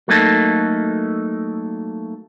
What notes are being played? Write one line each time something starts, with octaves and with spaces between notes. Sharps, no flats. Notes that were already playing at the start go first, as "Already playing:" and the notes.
F#3 A3 A#3 D#4 A4